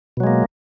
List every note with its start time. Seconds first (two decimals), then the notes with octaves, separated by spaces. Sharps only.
0.17 B2
0.20 F#3
0.24 G#3
0.27 A#3